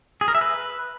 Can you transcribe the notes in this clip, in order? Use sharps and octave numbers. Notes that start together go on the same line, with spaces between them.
G#4
A#4
E5
B4